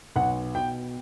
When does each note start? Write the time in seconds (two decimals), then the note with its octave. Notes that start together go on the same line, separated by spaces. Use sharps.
0.16 B1 F#5
0.55 B2 G5